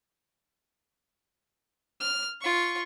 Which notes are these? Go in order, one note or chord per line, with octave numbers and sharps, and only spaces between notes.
F6
F4 C#6